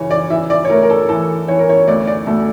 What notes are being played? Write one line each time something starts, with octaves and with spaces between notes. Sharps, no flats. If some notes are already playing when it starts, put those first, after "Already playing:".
Already playing: C#3 E3 C#5
D5
E3 E5
D5
C#5
A3 A#4
A#4
A4
E3 A4
E3 C#5
A#4
C#5
D2 D5
D5
D2 A4